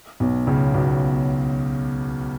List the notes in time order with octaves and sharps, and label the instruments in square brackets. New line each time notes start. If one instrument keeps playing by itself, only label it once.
[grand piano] B1 B2
C#2 C#3
B1 B2